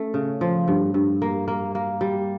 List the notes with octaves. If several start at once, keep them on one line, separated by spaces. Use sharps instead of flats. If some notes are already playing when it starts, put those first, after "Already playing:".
Already playing: A3 C#4
C#3
F3
G2
G2
A#3
A#3
A#3
G3